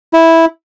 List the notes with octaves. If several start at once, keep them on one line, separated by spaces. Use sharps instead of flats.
E4